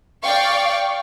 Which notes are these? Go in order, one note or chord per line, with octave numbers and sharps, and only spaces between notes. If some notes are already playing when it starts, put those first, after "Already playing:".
D5 F5 G5 C#6